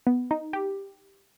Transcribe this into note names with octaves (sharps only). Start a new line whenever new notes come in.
B3
D#4
G4